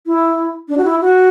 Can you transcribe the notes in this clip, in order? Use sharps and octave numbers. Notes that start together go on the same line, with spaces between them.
E4
D4
F#4
E4
F#4